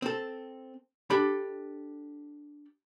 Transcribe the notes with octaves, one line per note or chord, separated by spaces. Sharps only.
C4 A4
D4 G4 A4 B5